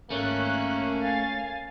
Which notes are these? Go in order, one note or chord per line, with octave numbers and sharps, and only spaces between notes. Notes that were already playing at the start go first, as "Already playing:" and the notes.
G#1 A3 A#3 C#4 F#6
F5 G#5 A6